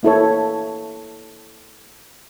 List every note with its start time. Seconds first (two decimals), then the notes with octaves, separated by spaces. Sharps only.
0.03 A#3 E4 A4 C#5